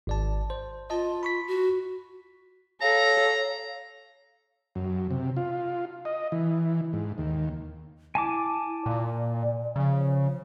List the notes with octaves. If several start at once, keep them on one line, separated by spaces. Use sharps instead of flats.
G#1 D5 A5
C5
F4 D#5 A5
B5 C#6 B6
F#4
A4 C#5 F5 A#5
F#2
C3
F4
D#5
E3
G#2
D#2
E4 G#5 A5 D6
A#2 D5
C#3 F3